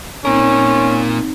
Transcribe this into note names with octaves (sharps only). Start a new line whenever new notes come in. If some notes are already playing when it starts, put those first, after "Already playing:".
A#2 C4 C#4 D#4 A#4